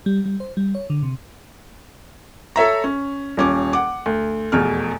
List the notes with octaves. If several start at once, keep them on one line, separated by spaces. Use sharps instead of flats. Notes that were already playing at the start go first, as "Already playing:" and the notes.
G3
G3
C5
G3
C#5
D3
C3
A4 C#5 E5 A#5
C#4
D#1 C#4 D6
F#5 D6
D2
F1 E2 B2 F6